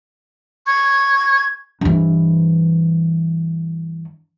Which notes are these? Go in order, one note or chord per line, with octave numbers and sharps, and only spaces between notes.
C#6 G#6
G2 E3